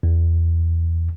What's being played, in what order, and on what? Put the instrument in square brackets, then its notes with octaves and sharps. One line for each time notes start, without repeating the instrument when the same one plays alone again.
[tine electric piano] E2